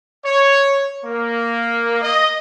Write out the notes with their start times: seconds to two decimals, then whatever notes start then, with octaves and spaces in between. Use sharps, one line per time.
0.24 C#5
1.04 A#3
2.01 D#5